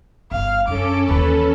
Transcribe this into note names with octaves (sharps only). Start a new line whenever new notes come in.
G1 F5
F#2 C#4 D4 A4 D6
D#2 E3 B4